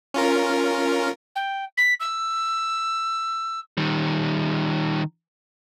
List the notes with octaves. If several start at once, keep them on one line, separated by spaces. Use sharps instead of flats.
C#4 F4 A#4
G5
B6
E6
D#3 G3